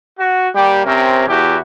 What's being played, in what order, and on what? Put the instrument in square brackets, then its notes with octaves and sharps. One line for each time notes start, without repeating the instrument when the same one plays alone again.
[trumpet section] F#4
[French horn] G3 [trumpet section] A#3 G4
[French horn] C3 [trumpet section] C4 C#4 A#4
[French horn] E2 [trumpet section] E4 F#4 G4